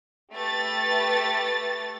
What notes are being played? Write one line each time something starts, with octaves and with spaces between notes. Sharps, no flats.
A3 G4 B4 A6